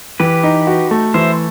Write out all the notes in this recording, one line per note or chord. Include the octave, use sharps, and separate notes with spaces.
E3 G4 B4
D#4
F#4
A3
E3 C5 E5